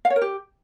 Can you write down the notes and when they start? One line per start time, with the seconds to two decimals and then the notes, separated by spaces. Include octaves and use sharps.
0.05 F5
0.10 C#5
0.16 A#4
0.21 G4